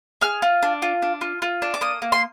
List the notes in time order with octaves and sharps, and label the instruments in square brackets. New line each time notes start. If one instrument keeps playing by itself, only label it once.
[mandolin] G#4 F6
F4
D4
F4
D4
F4
F4
D4
D6
A#3 D#6
A#3
C6